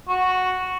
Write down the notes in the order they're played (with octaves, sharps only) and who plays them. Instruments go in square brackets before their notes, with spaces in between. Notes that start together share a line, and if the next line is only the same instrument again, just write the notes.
[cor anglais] F#4